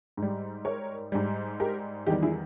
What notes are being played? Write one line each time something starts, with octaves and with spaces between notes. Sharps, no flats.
G#2 G3
A#4 C#5
G#2 G3
G4 A#4
E2 D#3 G3 D#4 G4
E4 G#4